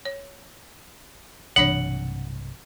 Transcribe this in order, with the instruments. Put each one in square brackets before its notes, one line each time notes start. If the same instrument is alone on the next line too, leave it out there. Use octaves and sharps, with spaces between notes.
[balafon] C#5
[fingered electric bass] B1 G2 C3 [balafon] E3 D4 C#5 [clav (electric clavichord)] F#5